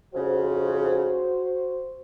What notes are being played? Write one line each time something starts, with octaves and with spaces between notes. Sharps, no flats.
F2 G#2 C#3 F#4 C5